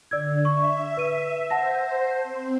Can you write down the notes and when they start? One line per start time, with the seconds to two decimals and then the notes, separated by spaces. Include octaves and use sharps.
0.11 D3 D5 E6 G#6
0.45 E5 C#6
0.97 B4 D#7
1.50 C5 F#5 A5 A#6
2.23 C4